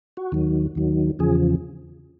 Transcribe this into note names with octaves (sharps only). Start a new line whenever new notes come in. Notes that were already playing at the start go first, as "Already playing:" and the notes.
F#4
D#2 D#3 F#3
D#2 D#3 F#3
E2 C#3 F3 G#4